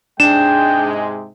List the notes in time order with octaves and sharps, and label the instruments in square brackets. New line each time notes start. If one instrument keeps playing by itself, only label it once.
[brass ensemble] G#2 C3 G#3 [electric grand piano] D4 [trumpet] G5 [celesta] E7